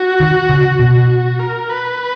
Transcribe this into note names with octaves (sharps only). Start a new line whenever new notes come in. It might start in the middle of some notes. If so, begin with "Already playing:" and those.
Already playing: F#4
D#3
C#3
B2
F#4
A#4
B4